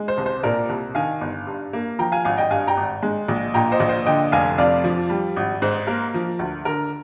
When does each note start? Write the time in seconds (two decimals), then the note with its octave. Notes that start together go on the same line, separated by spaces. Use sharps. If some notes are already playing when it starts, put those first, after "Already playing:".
Already playing: G#3
0.08 C5
0.18 C2
0.26 C5
0.43 A#2 A#4 D5
0.69 C2
0.95 D#3 F5 G#5
1.21 G1
1.47 G2
1.73 A#3
1.99 F3 G5 A#5
2.12 F5 G#5
2.25 G#1 F5 G#5
2.37 D#5 G5
2.51 G2 F5 G#5
2.67 G5 A#5
2.77 G#1
3.03 G#3
3.28 A#1
3.54 A#2 G5 A#5
3.72 C5 D#5
3.80 A#1
3.89 C5
4.06 D3 D#5 G5
4.32 F1 F5 G#5
4.58 F2 D5 F5
4.84 F3
5.10 G3
5.36 G#1
5.62 G#2 C5
5.87 A#3 A#4
6.14 F3
6.39 D2
6.65 D3 A#4